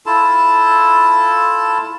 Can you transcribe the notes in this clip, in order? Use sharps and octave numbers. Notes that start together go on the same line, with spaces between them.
E4 F4 A4 A5